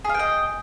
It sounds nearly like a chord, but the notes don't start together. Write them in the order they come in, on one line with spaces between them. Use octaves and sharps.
G#4 F5 G5 D#5